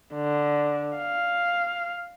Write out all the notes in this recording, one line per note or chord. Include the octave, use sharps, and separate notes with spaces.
D3
F5